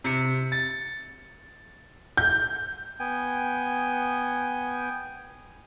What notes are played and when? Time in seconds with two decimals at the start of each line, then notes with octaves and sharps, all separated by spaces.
0.04 C3 C#7
0.52 A6
2.17 G6
3.00 B3 G5 G#5